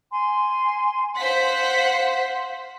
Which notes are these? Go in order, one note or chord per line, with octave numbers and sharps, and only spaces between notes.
G#5 C6
C5 F5 F#5 B6